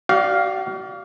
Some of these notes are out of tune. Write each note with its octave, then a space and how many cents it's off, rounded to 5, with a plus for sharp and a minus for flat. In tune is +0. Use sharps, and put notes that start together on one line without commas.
F#4 +45 D5 +0 F5 +5